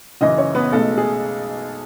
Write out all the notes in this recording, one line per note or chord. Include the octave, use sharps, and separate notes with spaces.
F#1 F#2 E3 D#4 D#5
C#4 C#5
B3 B4
B1 B2 G#3 A3 A4
G#4